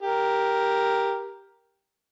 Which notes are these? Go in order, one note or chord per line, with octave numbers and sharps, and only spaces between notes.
G4 A#4